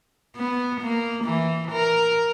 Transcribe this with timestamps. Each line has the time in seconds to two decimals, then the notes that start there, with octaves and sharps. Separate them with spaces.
0.36 B3
0.81 A#3
1.25 E3
1.72 A#4